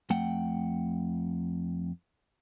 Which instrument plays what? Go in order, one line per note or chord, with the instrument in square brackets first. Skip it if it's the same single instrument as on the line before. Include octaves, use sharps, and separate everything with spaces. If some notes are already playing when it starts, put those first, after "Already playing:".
[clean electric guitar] F2 A3 F#5 G5